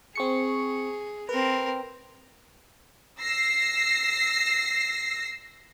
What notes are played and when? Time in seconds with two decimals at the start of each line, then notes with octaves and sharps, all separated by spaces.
0.15 C4 G#4 C#6 C#7
1.29 C4 A#4 B4
3.20 E6 A#6 C7